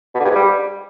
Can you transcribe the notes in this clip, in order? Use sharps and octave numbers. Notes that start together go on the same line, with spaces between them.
B2
D3
G2
G#2
G3